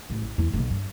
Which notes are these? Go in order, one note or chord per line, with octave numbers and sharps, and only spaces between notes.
A1
A1
E2 A3
D1 B1
G2